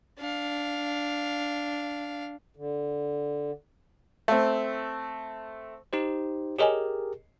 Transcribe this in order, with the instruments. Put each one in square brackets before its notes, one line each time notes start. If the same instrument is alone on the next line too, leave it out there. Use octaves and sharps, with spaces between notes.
[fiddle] D4 F5
[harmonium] D3
[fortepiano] A3 C4
[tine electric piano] D#4 G4 C5
[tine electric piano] G4 G#4 A#4 [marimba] C#5 D#5 G#5